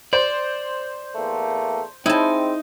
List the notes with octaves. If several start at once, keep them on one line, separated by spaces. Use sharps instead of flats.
C5 D5
E2 A3 A#3
G#3 C4 D#4 E4 A5